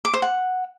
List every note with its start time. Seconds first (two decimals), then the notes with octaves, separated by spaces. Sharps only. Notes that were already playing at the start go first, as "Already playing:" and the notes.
0.05 D6
0.14 C5
0.22 F#5